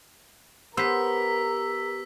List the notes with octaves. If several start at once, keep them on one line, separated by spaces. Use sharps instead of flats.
B3 G4 A#4 C5 E6 B6